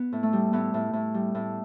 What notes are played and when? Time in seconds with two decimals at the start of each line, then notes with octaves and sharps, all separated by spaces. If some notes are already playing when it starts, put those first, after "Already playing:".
Already playing: B3
0.13 A2
0.23 A3
0.33 G3
0.53 A2 B3
0.74 A2
0.93 A2
1.14 G3
1.35 A2